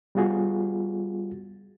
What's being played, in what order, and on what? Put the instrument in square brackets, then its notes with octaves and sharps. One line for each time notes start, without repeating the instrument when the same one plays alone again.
[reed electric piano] G3 B3 F4 F#4 G#4